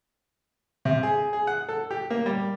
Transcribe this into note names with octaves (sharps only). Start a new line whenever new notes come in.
C3
G#4
G#4
F#5
A4
G4
A#3
G3